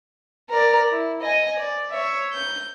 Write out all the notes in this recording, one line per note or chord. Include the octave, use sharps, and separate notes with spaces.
A#4 D5
E4
D#5 G#5
D5
C#5 E5
G6